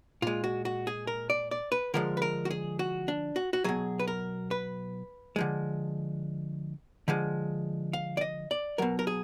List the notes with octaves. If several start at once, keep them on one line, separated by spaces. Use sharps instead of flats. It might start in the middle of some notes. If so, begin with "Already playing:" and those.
A#2 G#3 F4
F#4
F#4
G#4
A#4
D5
D5
B4
D3 F3 G#3 A#4
B4
A#4
F#4
G#4
F#4
D4
F#4
F#4
B2 F#3 G#4
B4
A#4
B4
D3 F3 G#3
D3 F3 G#3
F5
D5
D#5
D5
B2 F#3 A#4
A#4
G#4